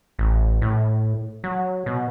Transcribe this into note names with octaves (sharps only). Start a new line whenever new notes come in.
A1
A2
F#3
B2